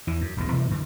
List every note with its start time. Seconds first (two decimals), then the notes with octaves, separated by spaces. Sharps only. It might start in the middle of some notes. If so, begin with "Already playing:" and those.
0.07 E2 E3
0.21 F#2
0.37 D#1 B1 G2 D3
0.52 B2 E3 G3 A#3
0.71 F#2 D3 E3